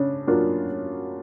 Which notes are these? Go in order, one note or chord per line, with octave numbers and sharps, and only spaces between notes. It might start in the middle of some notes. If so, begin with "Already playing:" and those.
Already playing: C#3 D4
F#3 A#3 D4 F4